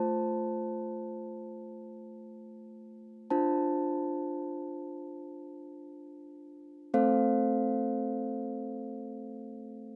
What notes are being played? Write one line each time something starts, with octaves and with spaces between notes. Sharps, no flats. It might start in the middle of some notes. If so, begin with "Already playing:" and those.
Already playing: A3 F4 C5 A5
D4 F4 C5 A5
A3 C4 A4 C5 F5